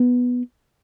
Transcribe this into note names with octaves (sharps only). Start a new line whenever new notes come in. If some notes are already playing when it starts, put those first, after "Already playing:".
Already playing: B3